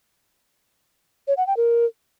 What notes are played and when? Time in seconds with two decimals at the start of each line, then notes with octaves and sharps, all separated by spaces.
1.28 C#5
1.37 F#5
1.47 G5
1.57 A#4